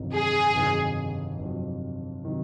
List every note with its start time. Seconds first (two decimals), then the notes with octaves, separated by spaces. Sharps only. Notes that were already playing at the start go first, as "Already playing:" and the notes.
Already playing: G1 F2 C3 D#3 F#3
0.13 G#4
0.54 G1 F2 C3 D#3 F#3
1.38 G1 F2 C3 D#3 F#3
2.23 C3 D#3 F#3